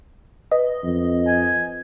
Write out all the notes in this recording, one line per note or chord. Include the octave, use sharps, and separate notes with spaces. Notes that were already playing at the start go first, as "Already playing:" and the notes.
B4 D#5
F2
G#5